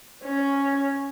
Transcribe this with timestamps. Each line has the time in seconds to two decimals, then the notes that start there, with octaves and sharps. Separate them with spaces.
0.24 C#4